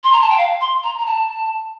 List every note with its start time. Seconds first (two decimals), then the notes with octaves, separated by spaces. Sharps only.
0.04 C6
0.12 A#5
0.22 A5
0.30 G5
0.38 F5
0.61 C6
0.83 A#5
0.99 A#5
1.06 A5